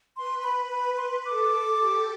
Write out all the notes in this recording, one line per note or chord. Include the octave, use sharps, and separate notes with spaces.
B4 C6
B5
B5
C6
A4 D6
G4